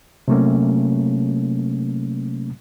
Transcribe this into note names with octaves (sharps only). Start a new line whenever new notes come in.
C3 F#3 A3 A#3 C#4